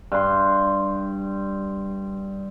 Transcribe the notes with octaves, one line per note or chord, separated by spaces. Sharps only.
G2 C6